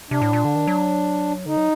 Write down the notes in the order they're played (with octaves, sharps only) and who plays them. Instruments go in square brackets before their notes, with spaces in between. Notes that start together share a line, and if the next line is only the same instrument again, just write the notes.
[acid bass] C3 [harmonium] D4
[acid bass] A2
A#2
D3
D#3
F#3
[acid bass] D3 [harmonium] D#4
[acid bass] F#3